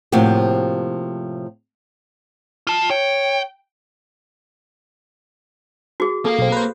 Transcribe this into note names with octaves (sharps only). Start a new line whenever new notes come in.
A2 C3 F3 A#3 F#4 G4
F4 A5
C#5 G5
F#4 G#4
A#3 A4 F5
B1 C4
B4 C5